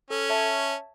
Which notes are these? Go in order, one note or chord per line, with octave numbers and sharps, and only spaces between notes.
C#4 A4
C#5 E5 A5